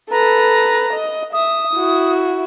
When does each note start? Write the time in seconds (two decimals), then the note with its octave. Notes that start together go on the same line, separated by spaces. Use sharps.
0.11 A4 B4 A#5
0.93 D#5
1.33 E5 D#6
1.75 E4 F#4